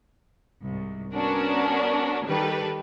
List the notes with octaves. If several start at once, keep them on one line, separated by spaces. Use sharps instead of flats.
C2 G#2
B3 C#4 D4 F#4 A#4
D#3 G3 G4 A4 B4